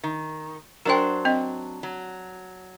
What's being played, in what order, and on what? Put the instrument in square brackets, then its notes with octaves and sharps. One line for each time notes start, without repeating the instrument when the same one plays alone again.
[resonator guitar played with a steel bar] D#3
[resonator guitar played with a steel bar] F#3 D4 C5 [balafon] A#4 G5
[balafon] C4 D#5
[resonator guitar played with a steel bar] F#3